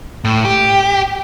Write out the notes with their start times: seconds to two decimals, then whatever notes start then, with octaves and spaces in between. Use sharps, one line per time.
0.24 A2
0.45 G4